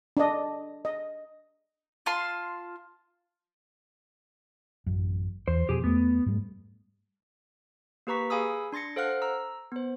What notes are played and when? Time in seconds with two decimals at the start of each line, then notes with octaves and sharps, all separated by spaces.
0.17 D4 D#5
0.85 D#5
2.06 F4 A5 C6
4.86 A1 F#2
5.48 E2 C5
5.69 F2 B2 G4 G#4
5.84 E2 A3 B3
6.26 G#2 G3 A3
8.07 A#3 G4 B4 A#5 C#6 B6
8.30 G#4 F5 G#5 B5 D#6 E6
8.72 D4 C6 A6 A#6 C#7
8.96 A4 C5 F5 F#5 F6 F#6
9.22 A#5 E6
9.72 B3 C5